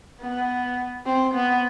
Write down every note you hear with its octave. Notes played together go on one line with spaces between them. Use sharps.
B3
C4
B3